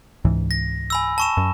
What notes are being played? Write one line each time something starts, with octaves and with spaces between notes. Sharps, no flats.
C#2 G#2 E3
A#6
G#5 B5 E6
A5 C#6 E7
F#2